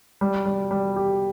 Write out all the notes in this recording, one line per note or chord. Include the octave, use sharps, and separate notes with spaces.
G3
G3
G3
G4